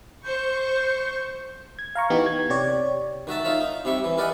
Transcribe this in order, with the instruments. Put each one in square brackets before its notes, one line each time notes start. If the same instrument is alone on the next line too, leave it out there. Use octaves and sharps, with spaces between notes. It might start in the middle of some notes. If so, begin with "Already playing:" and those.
[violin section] C5 C#6 [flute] G6
[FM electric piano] G#6
F5 A#5 C#6
E3 B3 D#4 G4
G#6
C3 G4 C#5 D5
[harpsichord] D#3 F#4 E5 A5
D#4 F4 C#5 E5
D#4
C3 G3 E5 C#6
E3
E4 A#4 D5 D#5 F#5 G#5